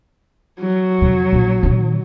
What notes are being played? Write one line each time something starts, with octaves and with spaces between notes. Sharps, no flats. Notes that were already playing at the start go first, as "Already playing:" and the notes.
F#3
F2 C3
A#1
A#2 D#3